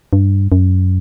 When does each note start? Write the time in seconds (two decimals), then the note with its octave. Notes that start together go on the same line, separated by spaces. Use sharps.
0.13 G2
0.52 F#2